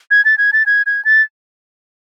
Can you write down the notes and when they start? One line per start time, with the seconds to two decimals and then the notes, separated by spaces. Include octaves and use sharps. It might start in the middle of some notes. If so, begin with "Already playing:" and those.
0.11 G#6
0.25 A6
0.38 G#6
0.53 A6
0.66 G#6
0.86 G#6
1.05 A6